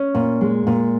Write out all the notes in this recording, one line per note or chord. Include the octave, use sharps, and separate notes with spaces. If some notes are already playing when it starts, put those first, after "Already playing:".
Already playing: C#4
A#2
G#3
A#2